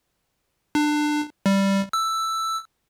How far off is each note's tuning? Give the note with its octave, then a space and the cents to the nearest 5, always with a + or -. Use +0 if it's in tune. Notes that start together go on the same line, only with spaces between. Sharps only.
D4 +25
G3 +0
E6 +5